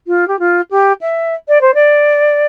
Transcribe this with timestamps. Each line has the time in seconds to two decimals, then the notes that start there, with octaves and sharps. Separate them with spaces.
0.07 F4
0.28 G4
0.39 F4
0.70 G4
1.01 E5
1.48 D5
1.61 C5
1.74 D5